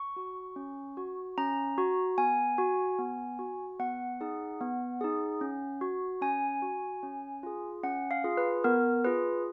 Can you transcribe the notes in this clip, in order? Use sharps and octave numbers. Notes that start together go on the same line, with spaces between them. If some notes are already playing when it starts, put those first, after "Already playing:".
Already playing: C#6
F#4
C#4
F#4
C#4 A#5
F#4
B3 G#5
F#4
B3
F#4
B3 F#5
D#4 G#4
B3
D#4 G#4
C#4
F#4
C#4 G#5
F#4
C#4
F4 G#4
C#4 F#5
F5
F4 G#4
B4
B3 A#4
F4 G#4 B4